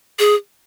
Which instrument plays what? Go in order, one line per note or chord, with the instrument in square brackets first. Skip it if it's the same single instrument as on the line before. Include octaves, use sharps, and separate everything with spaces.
[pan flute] G#4